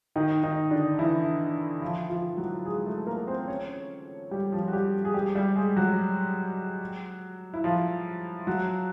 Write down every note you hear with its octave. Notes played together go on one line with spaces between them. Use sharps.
D#3 D#4
D#3 D#4
D3 D4
E3 E4
F3 F4
F3 F4
F#3 F#4
G#3 G#4
A3 A4
A#3 A#4
C4 C5
C#4 C#5
G3 G4
F3 F4
F#4
G3 G4
G#4
G3 G4
G3 G4
G#3 G#4
F#3 F#4
E4
F3 F4
F#3 F#4